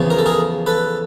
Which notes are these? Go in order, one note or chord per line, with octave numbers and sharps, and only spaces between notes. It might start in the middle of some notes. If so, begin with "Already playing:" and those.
Already playing: E2 C#3 F3
A#4
A4
G#4 A#4
A4 B4